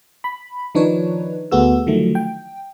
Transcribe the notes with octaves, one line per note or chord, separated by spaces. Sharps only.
B5
D#3 F3 D4 D#4 B4 C#5
D2 A3 B3 F#4 G#4 E6
D3 D#3 F3 F#3 A3
G5